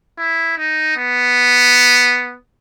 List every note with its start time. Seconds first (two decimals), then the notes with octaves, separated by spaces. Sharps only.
0.19 E4
0.58 D#4
0.97 B3